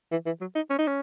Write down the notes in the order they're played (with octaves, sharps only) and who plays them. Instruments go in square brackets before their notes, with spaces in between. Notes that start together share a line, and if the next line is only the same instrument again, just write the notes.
[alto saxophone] E3
E3
F#3
D#4
C#4
D#4
C#4